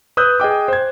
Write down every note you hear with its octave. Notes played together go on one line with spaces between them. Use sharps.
B4 D#6 E6 F#6 G6
G#4 D#5 G5 D6
C5 G#6